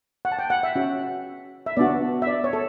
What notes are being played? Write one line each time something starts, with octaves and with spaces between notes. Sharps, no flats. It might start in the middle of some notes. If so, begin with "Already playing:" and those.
F#5
A5
G5
F#5
E5
C#4 F#4
E5
B3 D4 F#4 D5
E5
D5
C#5
A4